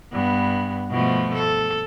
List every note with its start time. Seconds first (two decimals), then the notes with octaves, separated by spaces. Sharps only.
0.13 G2 B3
0.91 B2 F3 A3
1.34 A4